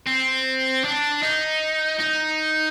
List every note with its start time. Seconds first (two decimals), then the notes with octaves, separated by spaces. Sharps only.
0.07 C4
0.84 D4
1.23 D#4
2.00 D#4